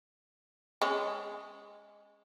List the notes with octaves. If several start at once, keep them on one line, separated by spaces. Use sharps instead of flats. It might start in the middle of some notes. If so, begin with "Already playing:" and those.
G#3 C#4